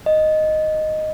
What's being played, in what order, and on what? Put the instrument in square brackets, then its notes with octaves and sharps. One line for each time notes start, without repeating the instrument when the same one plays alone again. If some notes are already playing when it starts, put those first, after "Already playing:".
[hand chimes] D#5